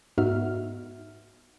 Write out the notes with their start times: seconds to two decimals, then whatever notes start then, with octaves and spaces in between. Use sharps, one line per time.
0.18 G#2 B3 D#4 F#4 E5 F6